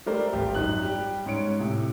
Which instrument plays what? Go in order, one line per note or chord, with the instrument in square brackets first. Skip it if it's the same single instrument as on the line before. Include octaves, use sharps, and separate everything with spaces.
[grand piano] G3 A3 A#4 C5 D5
G#1 G4
F#2 D#4 F#6 F#7
G3 G4
G#2 C#4 C#5 C#7 D7
A2 C3